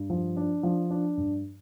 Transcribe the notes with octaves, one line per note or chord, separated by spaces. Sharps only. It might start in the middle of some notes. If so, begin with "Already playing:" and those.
Already playing: G2
F3
D4
F3
D4
G2